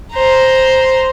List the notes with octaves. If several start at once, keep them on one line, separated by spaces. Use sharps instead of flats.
C5 A#5